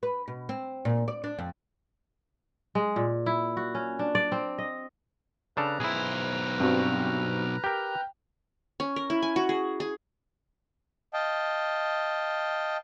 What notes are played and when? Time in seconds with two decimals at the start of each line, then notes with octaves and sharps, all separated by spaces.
0.03 B4
0.28 B2
0.49 C4
0.85 A#2
1.08 D5
1.24 D4
1.39 F2
2.75 G#3
2.96 A#2
3.26 E4
3.57 F#4
3.75 C#4
3.99 D4
4.15 D5
4.32 C4
4.58 D#5
5.57 C#3 D4 A4 B4 A#5 F6
5.80 B1 E4 G#4 C5
6.60 G2 C4 F#4
7.64 G4 A#4 G5
8.80 C#4
8.96 A#4
9.10 E4
9.22 G#5
9.36 F#4
9.49 G#4
9.80 G#4
11.13 D#5 F5 G5 A5